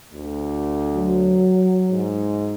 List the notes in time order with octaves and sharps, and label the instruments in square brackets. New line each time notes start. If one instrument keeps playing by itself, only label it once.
[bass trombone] D2
[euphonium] F#3
[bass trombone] G#2